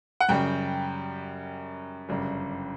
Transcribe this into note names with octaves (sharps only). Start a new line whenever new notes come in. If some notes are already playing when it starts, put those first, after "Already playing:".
F#5
F#2 C#3 G3 G5
G1 F#2 C#3 G3